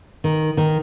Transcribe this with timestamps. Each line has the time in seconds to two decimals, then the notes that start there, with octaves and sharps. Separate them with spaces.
0.24 D#3
0.57 D#3